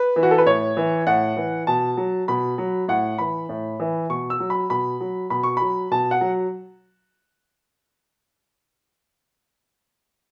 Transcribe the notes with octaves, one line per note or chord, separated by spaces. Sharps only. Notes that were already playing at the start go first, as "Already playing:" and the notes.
Already playing: B4
E3
F#4
A4
B4
A2 C#5
E3
A2 F#5
E3
B2 A5
F#3
B2 B5
F#3
A2 F#5
E3 B5
A2
E3
B2 C#6
E6
F#3
B5
B2 B5
F#3
B2 B5
C#6
F#3 B5
B2 A5
F#5
F#3